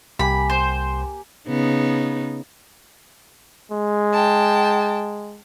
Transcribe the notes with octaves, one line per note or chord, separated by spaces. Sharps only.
C2 A#3 G4 G#5 B5
C5
C#3 B3 D#4
G#3
G5 A5